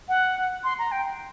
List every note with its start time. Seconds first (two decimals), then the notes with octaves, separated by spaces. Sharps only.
0.09 F#5
0.64 C6
0.79 A#5
0.92 G5